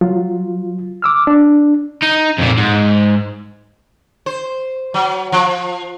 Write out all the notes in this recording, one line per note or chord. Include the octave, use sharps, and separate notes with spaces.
F#3 F4
D6 E6 F6
D4
D#4
F2 A#2
G#2
C5
F#3
F3